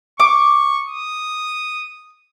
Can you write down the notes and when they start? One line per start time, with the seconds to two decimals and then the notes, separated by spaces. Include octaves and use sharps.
0.20 C#6 D6
0.88 D#6